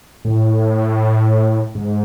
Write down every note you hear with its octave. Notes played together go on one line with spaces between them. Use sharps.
A2
G#2